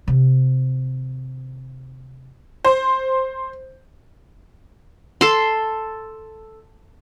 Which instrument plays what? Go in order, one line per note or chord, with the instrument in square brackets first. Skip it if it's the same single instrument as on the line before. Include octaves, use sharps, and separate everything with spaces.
[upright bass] C3 D#3
[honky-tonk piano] C5
[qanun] A4 C6